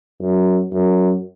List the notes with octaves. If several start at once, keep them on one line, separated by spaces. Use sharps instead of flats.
F#2
F#2